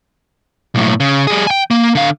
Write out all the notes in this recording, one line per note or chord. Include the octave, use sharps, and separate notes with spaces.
B1 A2
C#3
G3 G#4
G5 G#5
A#3
D3 F5